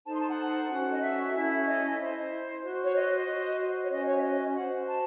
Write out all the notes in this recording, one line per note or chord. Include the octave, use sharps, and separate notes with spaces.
D#4 A4 C5 A5
C6
A5
F#5
C#4 F#4 A4
D#5
E5
C#4 E4 A4
D#5
E4 C5
F#4 C5
C#5
D#5
F#4 C5
C#5
C#4 F#4 C5 D#5
C#5
E5
D#5
F#4 C5 F#5
A5